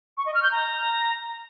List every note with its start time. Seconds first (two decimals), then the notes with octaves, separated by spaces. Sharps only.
0.18 C#6
0.26 D#5
0.34 F6
0.43 G6
0.51 A#5